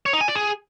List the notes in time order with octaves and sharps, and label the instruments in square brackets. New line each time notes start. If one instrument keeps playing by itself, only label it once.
[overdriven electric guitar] C#5
D#4
G#5
D5
G#4